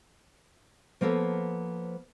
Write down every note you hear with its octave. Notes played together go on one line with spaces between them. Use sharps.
F3 A#3 B3 A4 C#5